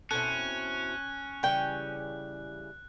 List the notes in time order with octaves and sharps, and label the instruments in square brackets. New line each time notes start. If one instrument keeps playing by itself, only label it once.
[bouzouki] B2 C4 E4 [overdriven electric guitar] C#4 [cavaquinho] A4 [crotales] F#6
[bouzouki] C#3 E3 G3 [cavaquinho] C#5 G5